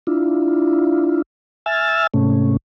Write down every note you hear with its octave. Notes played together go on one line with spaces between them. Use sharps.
D4 E4 F4
E5 G#5 E6 F6 A6
G#2 C3 A3 C#4